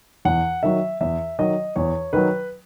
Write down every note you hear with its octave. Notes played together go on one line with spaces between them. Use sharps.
E2 F#5
D#3 F#3 E5
E2 E5
D#3 F#3 D#5
E2 C#5
D#3 F#3 B4